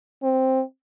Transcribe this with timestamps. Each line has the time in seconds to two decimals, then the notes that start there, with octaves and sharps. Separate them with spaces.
0.23 C4